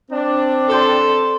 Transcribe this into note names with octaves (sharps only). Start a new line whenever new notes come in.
C4 D4
A4 D5 G5 C6